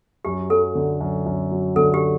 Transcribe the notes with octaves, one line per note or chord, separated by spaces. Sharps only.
F#2 G4
F#3 A4
D3
F#2
F#2
F#3
D3 A4
G4